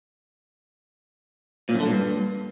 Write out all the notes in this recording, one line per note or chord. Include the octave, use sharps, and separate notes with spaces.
A#2
F#2
D3
A#2
G2